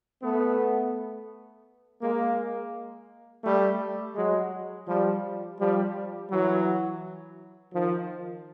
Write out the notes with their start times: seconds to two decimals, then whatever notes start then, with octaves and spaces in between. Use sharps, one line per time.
0.21 A3 B3
2.01 G#3 A#3
3.43 G3 A3
4.14 F#3 G#3
4.87 F3 G3
5.58 F3 G3
6.29 E3 F#3
7.72 D#3 F3